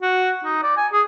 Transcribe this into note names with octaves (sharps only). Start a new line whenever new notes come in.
F#4
D#4
D5
G#5
G#4